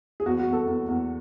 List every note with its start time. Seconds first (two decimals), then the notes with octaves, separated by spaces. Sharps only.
0.20 G#4
0.26 E2 F#4
0.39 F#4
0.47 E2
0.53 A4
0.67 E2
0.88 E2